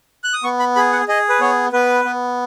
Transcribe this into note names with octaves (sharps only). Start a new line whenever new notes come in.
F#6
D#6
B3 C#6
B5
G#4 B5
F#5
G#4 D#5
B4
B3 C#5
B3 B4
B3